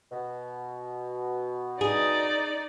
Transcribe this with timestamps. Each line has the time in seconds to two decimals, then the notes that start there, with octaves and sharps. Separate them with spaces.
0.11 B2
1.81 D#4 G#4 D5